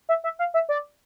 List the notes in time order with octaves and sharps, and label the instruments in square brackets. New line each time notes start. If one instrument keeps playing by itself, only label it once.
[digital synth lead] E5
E5
F5
E5
D5